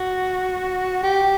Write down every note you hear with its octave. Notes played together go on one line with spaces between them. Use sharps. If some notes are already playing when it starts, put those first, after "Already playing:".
Already playing: F#4
G4